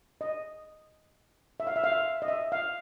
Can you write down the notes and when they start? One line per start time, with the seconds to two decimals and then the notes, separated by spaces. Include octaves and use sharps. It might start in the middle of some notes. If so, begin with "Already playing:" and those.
0.21 D#5
1.60 E5
1.67 F5
1.76 E5
1.84 F5
1.92 E5
2.22 D#5
2.28 E5
2.52 F5